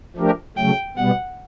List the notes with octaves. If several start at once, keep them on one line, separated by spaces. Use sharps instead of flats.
F3 A3 D4 G4 A#4
C#3 F#3 A3 G5
B2 G3 B3 F#5